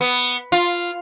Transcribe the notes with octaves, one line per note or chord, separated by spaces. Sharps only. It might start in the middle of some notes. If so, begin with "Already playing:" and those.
B3
F4